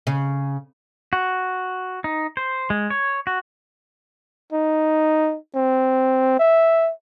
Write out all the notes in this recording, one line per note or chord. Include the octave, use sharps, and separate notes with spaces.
C#3
F#4
D#4
C5
G#3
C#5
F#4
D#4
C4
E5